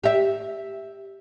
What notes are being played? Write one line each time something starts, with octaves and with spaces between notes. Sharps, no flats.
G4 E5